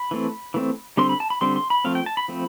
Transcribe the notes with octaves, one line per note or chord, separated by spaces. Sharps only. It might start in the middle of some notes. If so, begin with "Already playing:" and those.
Already playing: B5
E3 A3 C4
E3 A3 C4
D3 G3 C4 C6
B5
A5
B5
D3 G3 C4 C6
C6
B5
F3 A3 C4 F5
G5
A5
B5
F3 A3 C4